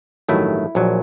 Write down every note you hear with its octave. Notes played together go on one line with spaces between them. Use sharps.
A1 G2 D#3 F#3 A3 E4
A#1 A#2 F#3